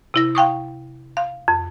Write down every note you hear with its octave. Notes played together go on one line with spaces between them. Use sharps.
C3 E4 A#6
F5 G5 C#6 D#6
F5
F2